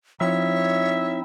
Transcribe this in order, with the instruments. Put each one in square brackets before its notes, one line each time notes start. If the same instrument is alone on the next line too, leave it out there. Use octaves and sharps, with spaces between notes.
[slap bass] F3 [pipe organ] C4 D#4 E4 [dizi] C#5 [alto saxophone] E5